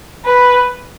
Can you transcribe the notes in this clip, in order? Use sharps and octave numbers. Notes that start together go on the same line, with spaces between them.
B4